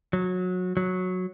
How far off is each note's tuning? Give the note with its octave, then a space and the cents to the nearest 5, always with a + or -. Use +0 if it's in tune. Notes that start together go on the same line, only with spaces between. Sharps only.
F#3 -20
F#3 -10